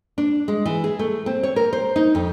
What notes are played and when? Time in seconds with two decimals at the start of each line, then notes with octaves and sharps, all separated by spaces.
0.18 D4
0.48 G#3
0.66 E3
0.84 G#4
0.99 A3
1.26 C4
1.43 C#5
1.56 A#4
1.73 C5
1.96 D#4
2.15 F2